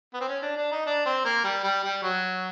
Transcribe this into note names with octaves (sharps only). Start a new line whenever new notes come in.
B3
C4
C#4
D4
D4
D#4
D4
C4
A#3
G3
G3
G3
F#3